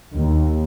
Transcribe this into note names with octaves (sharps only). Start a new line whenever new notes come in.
D#2